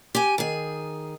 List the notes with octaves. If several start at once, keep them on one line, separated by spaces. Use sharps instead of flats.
G4 G#5
D#3 G#4